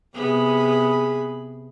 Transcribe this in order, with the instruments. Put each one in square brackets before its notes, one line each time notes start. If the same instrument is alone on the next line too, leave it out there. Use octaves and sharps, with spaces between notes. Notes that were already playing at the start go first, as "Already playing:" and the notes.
[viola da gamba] C3 B3 [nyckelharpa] G#4 B5